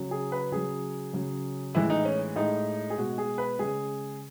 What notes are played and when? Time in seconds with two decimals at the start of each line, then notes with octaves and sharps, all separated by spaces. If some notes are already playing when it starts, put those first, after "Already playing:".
Already playing: C#3 F#3
0.11 G#4
0.32 B4
0.52 C#3 F#3 G#4
1.13 C#3 F#3
1.74 A2 E3 G#3 E4
1.90 D#4
2.05 C#4
2.36 A2 G#3 D#4
2.90 G#4
2.97 B2 G#3 F#4
3.18 G#4
3.38 B4
3.59 C#3 G#3 G#4